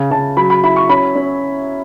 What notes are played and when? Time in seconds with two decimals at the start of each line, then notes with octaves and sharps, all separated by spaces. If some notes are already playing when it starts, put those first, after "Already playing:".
Already playing: C#3
0.11 C#3 A5
0.37 F#3 B5
0.50 B5
0.63 E4 B5
0.76 C#6
0.89 C#4 B5
1.15 C#4